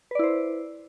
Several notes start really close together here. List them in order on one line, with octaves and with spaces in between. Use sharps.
B4 D5 E4 C5